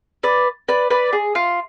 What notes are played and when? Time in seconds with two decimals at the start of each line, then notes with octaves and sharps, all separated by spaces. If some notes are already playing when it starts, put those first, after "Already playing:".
0.23 B4 D5
0.69 B4 D5
0.90 B4 D5
1.13 G#4
1.35 F4